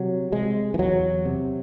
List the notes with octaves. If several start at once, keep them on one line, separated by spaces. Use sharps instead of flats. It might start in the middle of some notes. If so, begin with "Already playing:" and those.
Already playing: C3 F#3
C3 G#3
E3
E2 F#3
C3